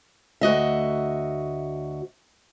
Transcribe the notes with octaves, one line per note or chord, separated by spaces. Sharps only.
D2 F#4 D#5 E5